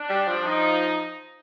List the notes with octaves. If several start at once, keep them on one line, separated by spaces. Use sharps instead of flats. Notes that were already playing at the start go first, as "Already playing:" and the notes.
Already playing: D4
G3
F3
D#4